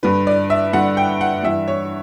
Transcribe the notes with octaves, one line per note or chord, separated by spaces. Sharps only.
G2 D3 B4
D5
E5
G2 D3 F#5
G5
F#5
G2 E3 E5
C#5